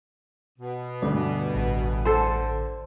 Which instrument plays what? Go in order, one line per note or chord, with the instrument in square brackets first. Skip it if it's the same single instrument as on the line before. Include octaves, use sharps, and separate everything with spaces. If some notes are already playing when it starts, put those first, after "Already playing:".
[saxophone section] B2
[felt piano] D2 G2 [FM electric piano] D5
[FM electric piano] A1
[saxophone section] D3 [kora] A4 C5